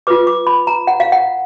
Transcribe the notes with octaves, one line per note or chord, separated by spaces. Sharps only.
F4 B4 D6
D6
B5
A#5
F#5
F5
F#5